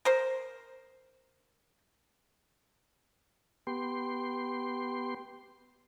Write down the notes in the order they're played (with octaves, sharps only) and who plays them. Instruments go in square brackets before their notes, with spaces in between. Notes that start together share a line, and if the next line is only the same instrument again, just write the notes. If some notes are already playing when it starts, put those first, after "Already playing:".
[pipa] A#4 C5
[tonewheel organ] B3 G4 C6